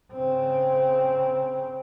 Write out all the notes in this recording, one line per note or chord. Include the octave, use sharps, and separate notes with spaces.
C#3 C4